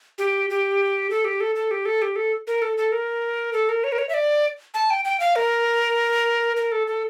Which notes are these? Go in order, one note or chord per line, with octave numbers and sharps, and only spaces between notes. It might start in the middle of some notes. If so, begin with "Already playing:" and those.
G4
G4
A4
G4
A4
A4
G4
A4
G4
A4
A#4
A4
A4
A#4
A4
A#4
C#5
A#4
C#5
E5
D5
A5
G5
G5
F5
A#4
A#4
A4
A4